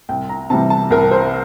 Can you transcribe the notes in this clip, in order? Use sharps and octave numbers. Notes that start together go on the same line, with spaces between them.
C2 G5
A#5
C3 E3 G3 A5
A5
C2 A#4
C5